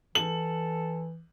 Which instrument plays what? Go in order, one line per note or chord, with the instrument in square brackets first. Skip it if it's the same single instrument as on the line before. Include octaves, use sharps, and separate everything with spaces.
[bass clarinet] E3 [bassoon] A4 [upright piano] F#7